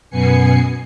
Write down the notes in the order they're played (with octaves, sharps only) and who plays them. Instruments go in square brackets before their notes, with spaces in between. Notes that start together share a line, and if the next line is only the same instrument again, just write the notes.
[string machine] F#2 B2 B3 G#5 C7 C#7